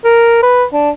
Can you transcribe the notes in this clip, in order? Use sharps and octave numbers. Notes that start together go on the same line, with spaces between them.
A#4
B4
D4